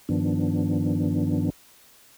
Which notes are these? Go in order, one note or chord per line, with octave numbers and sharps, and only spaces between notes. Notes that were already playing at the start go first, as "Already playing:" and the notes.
G2 D#3 F3 B3 D4